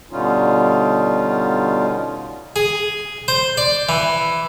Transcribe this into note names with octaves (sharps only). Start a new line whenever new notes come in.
B2 D3 G3 C#4 D#4 F4
G#4
C5
D5
E3